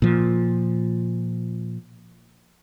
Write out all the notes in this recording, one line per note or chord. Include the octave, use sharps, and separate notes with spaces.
A#2 F3